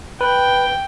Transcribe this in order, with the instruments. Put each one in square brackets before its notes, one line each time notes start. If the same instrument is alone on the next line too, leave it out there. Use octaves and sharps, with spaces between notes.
[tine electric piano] B4 [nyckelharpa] G5